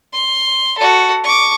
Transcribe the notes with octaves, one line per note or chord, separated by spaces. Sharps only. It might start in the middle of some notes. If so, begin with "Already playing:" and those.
C6
F#4 A4
C#6 D6